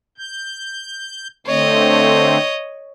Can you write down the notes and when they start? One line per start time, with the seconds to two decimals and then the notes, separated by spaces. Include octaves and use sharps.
0.18 G6
1.46 D3 A3 C4 C#5 D#5